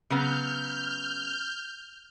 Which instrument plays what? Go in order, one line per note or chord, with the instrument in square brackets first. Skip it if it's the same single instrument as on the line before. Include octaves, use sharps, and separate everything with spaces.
[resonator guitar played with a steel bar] C#3 F#3 B3 [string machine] F6 G6